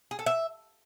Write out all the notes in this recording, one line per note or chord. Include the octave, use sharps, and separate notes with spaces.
G#4
A4
E5